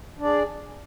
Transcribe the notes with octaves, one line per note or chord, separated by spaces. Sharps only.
D4 G#4 D5